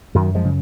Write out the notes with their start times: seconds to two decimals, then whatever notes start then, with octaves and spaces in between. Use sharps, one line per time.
0.15 F#2 D#3 F#3
0.35 F3 G#3
0.44 C#3